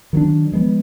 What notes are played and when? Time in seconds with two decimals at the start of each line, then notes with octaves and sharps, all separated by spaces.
0.13 D#3 F#3 B3 D4
0.52 F3 G#3 B3